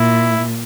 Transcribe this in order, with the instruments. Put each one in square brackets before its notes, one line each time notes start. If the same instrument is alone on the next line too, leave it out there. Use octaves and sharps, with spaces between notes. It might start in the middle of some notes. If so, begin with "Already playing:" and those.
Already playing: [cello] A#2 [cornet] E4